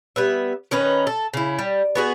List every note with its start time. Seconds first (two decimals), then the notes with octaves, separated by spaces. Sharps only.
0.16 G3 B3 E5
0.71 D#3 C#4 D#4 B4
1.07 A4
1.34 C#3 E4
1.59 G3
1.95 B3 F#4 G#4